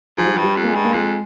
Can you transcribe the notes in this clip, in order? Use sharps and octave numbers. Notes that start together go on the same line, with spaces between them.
G#2 F3
G3
G2 F3
G3
F2
A#3
G#3
G2
A#3
F2 G#3